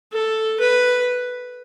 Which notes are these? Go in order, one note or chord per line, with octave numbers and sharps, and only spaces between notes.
A4
B4